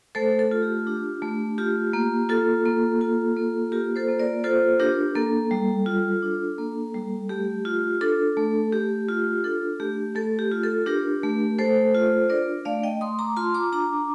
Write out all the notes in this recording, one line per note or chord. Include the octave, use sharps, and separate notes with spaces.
A3 A4 C5
A4
F4
G4
D4 G4
A3
F4 G4
A#3
F4 A4
A#3
F4
A#3
F4 G4 A#4
A4 C5
A#3
A#4 D5
F4 A4 C5
D4 G4 A#4
A#3 A4
G3
F4
D4
A#3
G3
A3 G4
F4
D4 A4
A3
A3 G4
F4
D4 A4
A3 G4
A3 A4
G4
F4
A4
D4 G4 A#4
A3
A3 A4 C5
F4
D4 A#4 D5
A3 D5 F5
D#5 G5
A3 C6 D#6
A#5 D6
F4 A5 C6
A#5 D6
D4 A#5 D6